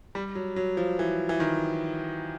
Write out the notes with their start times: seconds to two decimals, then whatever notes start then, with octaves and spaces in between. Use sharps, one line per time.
0.15 G3
0.35 F#3
0.56 F#3
0.77 F3
0.99 E3
1.29 E3
1.40 D#3